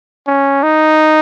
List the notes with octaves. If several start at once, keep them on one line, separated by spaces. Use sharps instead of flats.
C#4
D#4